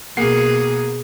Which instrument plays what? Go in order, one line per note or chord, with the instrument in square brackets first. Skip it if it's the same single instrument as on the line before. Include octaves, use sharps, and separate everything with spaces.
[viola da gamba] B2 G#4 [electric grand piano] A#3 F#5 C7